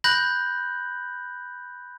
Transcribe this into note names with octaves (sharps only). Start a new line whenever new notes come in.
B5 F#6 G6 A#6 F#7